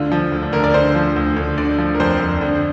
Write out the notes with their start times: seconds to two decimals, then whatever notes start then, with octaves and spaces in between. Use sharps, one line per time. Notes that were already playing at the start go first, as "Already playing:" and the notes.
Already playing: D2 D3 F4
0.12 F3
0.32 D2
0.42 D4
0.52 D2 A#4
0.64 D5
0.74 D3 C5
0.95 F3
1.16 D2
1.36 D2
1.58 D3 D5
1.78 F3
1.95 A#4
2.00 F2 C5
2.20 F2
2.41 D3